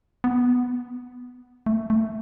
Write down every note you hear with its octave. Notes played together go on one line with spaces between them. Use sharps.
B3
A3
A3